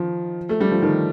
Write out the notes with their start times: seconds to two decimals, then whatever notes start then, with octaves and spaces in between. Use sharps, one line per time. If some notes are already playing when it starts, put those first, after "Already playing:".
Already playing: D#3 F3
0.49 A3
0.61 G3
0.71 F3
0.82 D#3